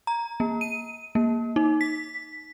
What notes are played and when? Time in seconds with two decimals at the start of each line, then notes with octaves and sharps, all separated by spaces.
0.07 A#5
0.40 A#3
0.61 D#7
1.15 A#3
1.56 D#4
1.81 B6